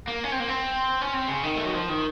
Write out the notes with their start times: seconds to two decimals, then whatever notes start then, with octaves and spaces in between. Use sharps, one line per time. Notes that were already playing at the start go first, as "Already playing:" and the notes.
0.08 A#3
0.24 C#4
0.32 C4
0.40 A#3
0.49 C4
1.02 C#4
1.14 C4
1.28 C#3
1.43 D#3
1.56 A3
1.65 F#3
1.74 F3
1.90 D#3